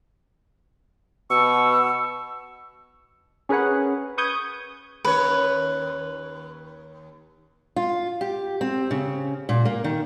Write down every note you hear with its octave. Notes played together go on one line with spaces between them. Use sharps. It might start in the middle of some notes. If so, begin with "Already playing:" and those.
B2 C#6 E6
C#4 G#4 A#4 B4 C#5 F#5
B4 C#6 D#6 G6 G#6
D#2 C#4 B4 C#5
F4
G4
C4
C#3
A#2
A#3
D#3